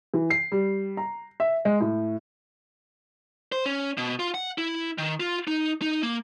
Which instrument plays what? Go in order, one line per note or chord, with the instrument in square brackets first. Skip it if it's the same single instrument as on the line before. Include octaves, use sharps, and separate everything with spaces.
[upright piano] E3
C7
G3
A#5
E5
G#3
A2
[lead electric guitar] C5
C#4
B2
F4
F#5
E4
D#3
F4
D#4
D#4
A#3